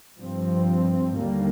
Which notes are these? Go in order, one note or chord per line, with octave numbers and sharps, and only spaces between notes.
G2 F3 C4
D#2 D3 G3 A#3